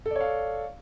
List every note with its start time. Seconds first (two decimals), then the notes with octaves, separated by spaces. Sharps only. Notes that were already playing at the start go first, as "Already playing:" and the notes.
0.06 A4
0.11 D5
0.16 C#5
0.21 F5